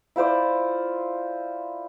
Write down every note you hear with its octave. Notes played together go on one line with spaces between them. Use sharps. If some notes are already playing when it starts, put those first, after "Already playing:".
E4 F4 C5 D5